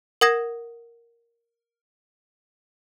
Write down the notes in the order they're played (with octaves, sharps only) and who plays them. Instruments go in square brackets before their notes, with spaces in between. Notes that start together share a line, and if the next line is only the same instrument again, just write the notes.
[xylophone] A#4 F#5 D#6 G#6 A#6 E7